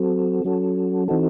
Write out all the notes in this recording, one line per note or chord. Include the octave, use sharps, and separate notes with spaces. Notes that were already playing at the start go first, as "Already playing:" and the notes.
Already playing: F#3 C4 F#4 A4
F#3 C#4 F#4 A4
E3 C4 D#4 F#4 A4